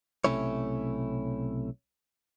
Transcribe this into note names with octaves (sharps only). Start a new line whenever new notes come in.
B1 C3 A3 C#4 E4 C#5